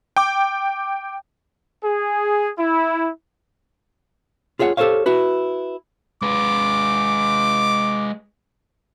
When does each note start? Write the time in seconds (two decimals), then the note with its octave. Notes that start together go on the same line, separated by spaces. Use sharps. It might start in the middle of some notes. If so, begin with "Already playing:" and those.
0.16 G5 D6
1.84 G#4
2.58 E4
4.59 F4 G#4 C#5 E5 F#5
4.77 G4 A4 A#4 C5 C#5 F5
5.06 E4 F#4 B4
6.22 G#3 B4 D6